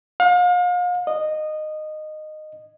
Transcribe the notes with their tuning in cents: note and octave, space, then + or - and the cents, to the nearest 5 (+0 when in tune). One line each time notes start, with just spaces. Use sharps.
F5 +40
D#5 -15